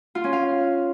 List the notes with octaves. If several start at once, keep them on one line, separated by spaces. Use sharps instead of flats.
F4
C#4
F5